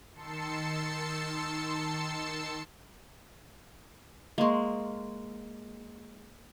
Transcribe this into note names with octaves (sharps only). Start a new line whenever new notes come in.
D#3 A5 C6 E6 C#7
G#3 A#3 D#5 C6 C#6